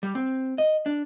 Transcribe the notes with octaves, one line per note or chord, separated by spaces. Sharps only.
G3
C4
D#5
D4